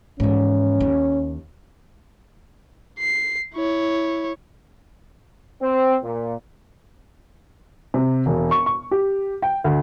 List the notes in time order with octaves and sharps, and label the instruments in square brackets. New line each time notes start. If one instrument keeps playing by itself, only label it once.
[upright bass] G#2 E3 [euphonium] C#4
[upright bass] D#2
[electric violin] C7
E4 C#5
[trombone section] C4
A#2
[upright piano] C3
E1
C#6
C#6
G4
G5
D2